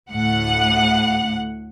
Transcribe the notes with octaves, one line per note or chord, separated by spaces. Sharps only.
D2 A2 F#5